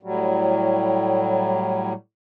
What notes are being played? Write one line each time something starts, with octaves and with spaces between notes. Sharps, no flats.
A2 F#3 G3